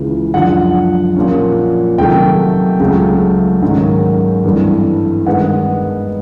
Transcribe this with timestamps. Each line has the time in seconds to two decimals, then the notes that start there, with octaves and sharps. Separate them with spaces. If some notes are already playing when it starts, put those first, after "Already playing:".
Already playing: C#2 C#3 E3
0.34 F#2 D3 F3 F#5
1.16 A#2 F3 A#3 C#4
1.98 C3 D#3 F#3 A3 G5
2.80 C#2 C#3 F#3 A3
3.62 G#2 D#3 F#3 A#3 C#4
4.44 G2 E3 A3 C4
5.26 G2 D#3 G#3 B3 F#5